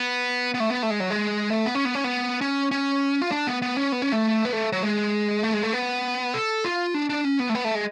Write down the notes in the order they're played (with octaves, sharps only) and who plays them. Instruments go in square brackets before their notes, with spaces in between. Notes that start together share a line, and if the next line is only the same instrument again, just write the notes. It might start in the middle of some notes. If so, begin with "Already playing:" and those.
Already playing: [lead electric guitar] B3
B3
A3
B3
A3
G#3
F#3
G#3
A3
B3
C#4
B3
C#4
B3
C#4
C#4
F4
D4
B3
B3
C#4
B3
C#4
A3
B3
A3
F#3
G#3
A3
G#3
A3
B3
A4
F4
D4
D4
C#4
B3
A3
B3
A3
G#3